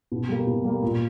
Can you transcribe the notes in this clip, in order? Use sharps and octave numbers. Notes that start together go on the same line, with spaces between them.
B2
G3 A#3
B2
G3 A#3
A#2